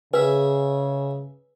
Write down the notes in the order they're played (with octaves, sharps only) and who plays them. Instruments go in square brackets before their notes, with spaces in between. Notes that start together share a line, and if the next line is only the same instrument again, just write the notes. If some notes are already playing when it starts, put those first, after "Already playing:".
[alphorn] C#3 [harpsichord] G#4 E5 [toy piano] B4